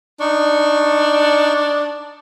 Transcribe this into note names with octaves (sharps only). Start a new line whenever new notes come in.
D4 D#4 C#6